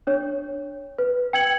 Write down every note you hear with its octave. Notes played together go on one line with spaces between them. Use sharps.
D4 C#5
B4
G5 E6 G#6 C#7 F#7